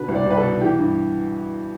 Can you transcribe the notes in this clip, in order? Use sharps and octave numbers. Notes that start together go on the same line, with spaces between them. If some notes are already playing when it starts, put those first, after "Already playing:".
Already playing: B2 D3 B4
C2
D5
C2 B4
A4
B2
E3 G4
G2